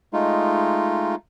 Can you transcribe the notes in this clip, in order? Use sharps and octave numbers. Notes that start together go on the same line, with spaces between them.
G#3 A3 D#4 F4